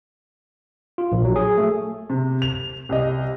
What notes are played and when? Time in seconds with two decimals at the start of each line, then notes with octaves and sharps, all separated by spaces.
0.98 F4
1.12 A#1
1.24 F#3
1.36 G#4
1.58 A3
2.10 C3
2.42 F7
2.89 C2 D#5